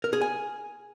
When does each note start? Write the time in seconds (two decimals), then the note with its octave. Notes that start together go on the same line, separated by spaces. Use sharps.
0.04 A#4
0.13 G#4
0.21 G#5